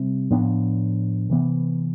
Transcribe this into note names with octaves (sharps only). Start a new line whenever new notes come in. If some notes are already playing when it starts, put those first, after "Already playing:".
Already playing: C3 G3 C4
A2 F3 B3 D4
C3 E3 B3